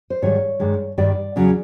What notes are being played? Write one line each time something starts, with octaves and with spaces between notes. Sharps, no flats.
C5
G#2 D#3 G3 C#5
G2 D#3 G#3
G2 D#3 G3 D5
E2 C#3 F#3